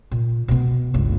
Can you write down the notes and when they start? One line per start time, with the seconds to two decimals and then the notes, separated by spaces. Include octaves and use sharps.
0.11 A#2
0.48 B2 B3
0.94 G1 C#2